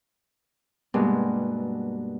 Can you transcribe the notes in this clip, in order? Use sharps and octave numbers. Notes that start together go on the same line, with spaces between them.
G2 B2 G#3 A#3